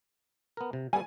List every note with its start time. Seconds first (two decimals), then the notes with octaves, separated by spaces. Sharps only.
0.57 B3 A#4
0.73 C3
0.93 G3 B3 A4 G#5